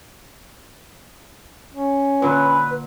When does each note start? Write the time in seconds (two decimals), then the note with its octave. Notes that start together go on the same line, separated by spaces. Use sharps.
1.74 C#4
2.22 A#2 D3 B4